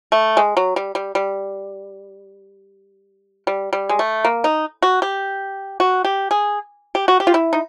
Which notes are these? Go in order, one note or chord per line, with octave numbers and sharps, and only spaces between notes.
A3
G#3
F#3
G3
G3
G3
G3
G3
G#3
A3
A#3
D#4
F#4
G4
F#4
G4
G#4
G4
F#4
G4
F4
E4
D#4